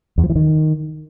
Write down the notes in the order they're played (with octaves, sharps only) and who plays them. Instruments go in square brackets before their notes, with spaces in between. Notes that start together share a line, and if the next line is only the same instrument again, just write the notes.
[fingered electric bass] E2
F3
E3
D#3